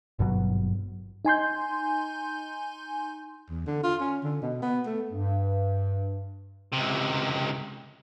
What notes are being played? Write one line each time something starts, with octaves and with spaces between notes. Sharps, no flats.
G#1 G2 B2 F#3
D#4 G#5 C6 G6
E2
D3
F4
C#4
D3
B2
B3
A3
G2
C#2 C3